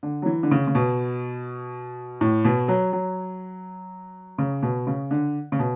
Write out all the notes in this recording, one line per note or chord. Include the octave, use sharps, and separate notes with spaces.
D3
F#3
E3
D3
C#3
C#3
B2
A2
B2
F#3
F#3
C#3
B2
C#3
D3
C#3
B2